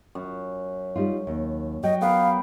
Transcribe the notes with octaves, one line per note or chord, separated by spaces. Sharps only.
F#2
G3 D#4 F4
D#2
F#3 D#5 G5
B3 A#4 B4 F5